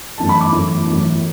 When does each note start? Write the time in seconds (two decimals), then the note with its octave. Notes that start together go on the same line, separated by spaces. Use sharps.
0.18 F#2 E3 A3 A5
0.29 B5
0.41 D6
0.52 F#2 E3 A3
0.86 F#2 E3 A3